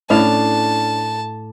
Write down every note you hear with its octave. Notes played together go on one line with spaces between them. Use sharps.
A2 C#4 D4 F5 A5